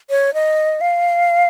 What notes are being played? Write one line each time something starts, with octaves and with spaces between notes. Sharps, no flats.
C#5
D#5
F5